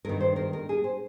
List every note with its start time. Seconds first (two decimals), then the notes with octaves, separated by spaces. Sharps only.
0.05 G2 A#4
0.09 D#3
0.20 C5
0.36 A#4
0.53 A#4
0.69 G#4
0.84 C5